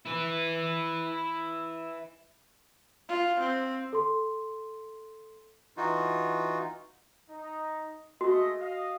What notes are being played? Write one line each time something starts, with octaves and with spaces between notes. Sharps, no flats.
E4 B4
F4
C4
A4 C6
E3 D#4 F4 F#4
D#4
G#3 A3 F#4 D#5
D#5 F5